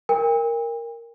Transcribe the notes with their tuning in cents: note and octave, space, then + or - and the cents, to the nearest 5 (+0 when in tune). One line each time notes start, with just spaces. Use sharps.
A#4 +0 G5 +45